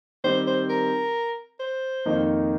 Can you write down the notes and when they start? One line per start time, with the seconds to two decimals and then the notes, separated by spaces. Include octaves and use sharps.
0.24 D#3 G3 C4 G4 C5
0.47 C5
0.70 A#4
1.60 C5
2.05 F2 D#3 A#3 D#4